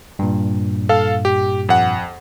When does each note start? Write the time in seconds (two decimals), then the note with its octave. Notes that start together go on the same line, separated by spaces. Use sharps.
0.19 G2 A#2
0.89 A4 F5
1.25 G4
1.69 F2 F#5